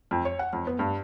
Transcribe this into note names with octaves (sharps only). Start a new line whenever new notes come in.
F2
C#5
F#5
F2
B3
G2